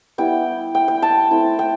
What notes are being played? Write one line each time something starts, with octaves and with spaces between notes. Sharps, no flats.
G3 B3 E4 G5
G5
G5
A5
A3 C4 E4
G5